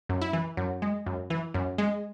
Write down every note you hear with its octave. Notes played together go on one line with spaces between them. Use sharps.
F#2
E4
E3
F#2
G#3
F#2
E3
F#2
G#3